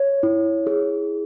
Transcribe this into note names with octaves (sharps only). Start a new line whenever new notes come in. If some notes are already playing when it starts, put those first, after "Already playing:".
Already playing: C#5
E4
G#4